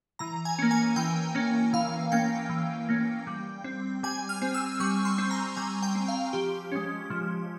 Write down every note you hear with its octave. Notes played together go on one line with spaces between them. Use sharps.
E3 A#5
G#5
A#3 C#4
G#5
E3 G5
A#3 C#4
E3 F5
A#3 C#4 G5
E3
A#3 C#4
G3
C4
G3 G#5
F6
C4
E6
G3 C#6
C6
C4
A#5
G3 G#5
G5
C4
F5
F3 G4
G#3 C#4
F3